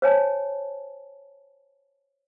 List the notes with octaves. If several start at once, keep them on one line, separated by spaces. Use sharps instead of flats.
C5 C#5 G#5 A5